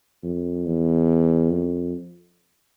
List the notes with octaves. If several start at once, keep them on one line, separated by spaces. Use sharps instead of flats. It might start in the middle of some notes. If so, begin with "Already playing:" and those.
F2
E2
F2